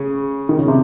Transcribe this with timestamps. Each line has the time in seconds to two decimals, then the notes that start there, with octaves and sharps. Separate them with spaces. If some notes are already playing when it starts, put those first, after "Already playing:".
Already playing: C#3
0.49 D#3
0.59 C#3
0.68 C3